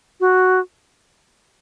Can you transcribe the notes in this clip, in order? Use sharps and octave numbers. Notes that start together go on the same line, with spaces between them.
F#4